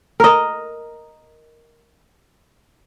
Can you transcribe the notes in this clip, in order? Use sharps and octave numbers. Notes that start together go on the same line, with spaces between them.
A#4 D#5